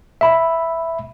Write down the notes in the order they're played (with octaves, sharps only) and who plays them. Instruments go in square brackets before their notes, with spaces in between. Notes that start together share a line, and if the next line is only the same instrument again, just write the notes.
[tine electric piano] E5 B5